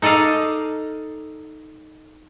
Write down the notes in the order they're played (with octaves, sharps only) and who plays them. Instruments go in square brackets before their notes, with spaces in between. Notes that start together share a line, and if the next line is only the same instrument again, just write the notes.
[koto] D#4 A4 D5 D#5 F5